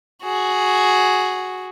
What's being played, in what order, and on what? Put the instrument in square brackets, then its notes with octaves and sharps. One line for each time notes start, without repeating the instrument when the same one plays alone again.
[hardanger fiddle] F#4 G#4